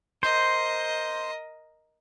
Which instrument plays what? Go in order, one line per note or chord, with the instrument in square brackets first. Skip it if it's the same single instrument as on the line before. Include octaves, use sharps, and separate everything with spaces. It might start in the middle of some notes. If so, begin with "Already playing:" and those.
[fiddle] A#4 D#5 [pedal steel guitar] C5